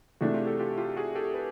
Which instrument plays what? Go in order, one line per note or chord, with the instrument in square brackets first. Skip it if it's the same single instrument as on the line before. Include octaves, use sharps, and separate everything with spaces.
[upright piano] C3 E3 A3 D4 [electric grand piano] F#4 G#4
[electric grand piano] F4 G4
G4 A4
F4 G4
F4 G4
F#4 G#4
G4 A4
A4 B4